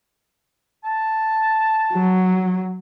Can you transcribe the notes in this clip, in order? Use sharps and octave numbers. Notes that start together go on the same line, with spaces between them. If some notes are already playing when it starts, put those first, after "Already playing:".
A5
F#3